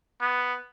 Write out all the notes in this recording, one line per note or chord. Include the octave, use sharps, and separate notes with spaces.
B3